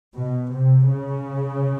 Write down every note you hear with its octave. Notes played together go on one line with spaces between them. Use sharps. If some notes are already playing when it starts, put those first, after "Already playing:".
B2
C3
C#3